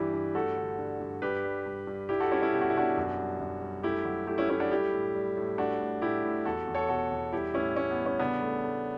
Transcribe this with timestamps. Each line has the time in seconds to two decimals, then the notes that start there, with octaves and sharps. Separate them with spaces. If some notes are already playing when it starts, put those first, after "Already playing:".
Already playing: G2 E3 G3 E4 G4
0.13 G2
0.35 A3 F#4 A4
0.57 D3
0.78 G2
1.00 G2
1.22 G2 G4 B4
1.44 G3
1.66 G2
1.87 G2
2.09 G3 E4 G4
2.20 F#4 A4
2.31 G3 C#4 E4
2.42 C#4 E4
2.52 B2 G4
2.61 F#4
2.70 E4
2.75 B2 D4 F#4
2.97 F#2
3.18 G3
3.40 F#2
3.62 G3
3.83 A3 E4 G4
4.05 F#3
4.27 A3 E4 G4
4.38 C#4 E4
4.49 A3 C#4 E4
4.60 D4 F#4
4.71 G3 E4 G4
4.92 A2
5.15 G3
5.37 A2
5.58 A3 D4 F#4
5.81 A2
6.02 A2 E4 G4
6.24 A2
6.45 E2 F#4 A4
6.67 E2
6.75 A4 C#5
6.89 B2 F#4 A4
7.11 E2
7.33 G3 E4 G4
7.54 A2 C#4 E4
7.76 A2 C#4
7.91 B3
7.98 G3
8.06 C#4
8.19 C#3 B3 D4
8.42 A3
8.64 A3